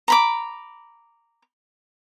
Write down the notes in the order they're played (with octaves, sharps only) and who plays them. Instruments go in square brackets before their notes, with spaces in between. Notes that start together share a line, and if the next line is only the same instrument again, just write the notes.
[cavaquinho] A#5 B5 D6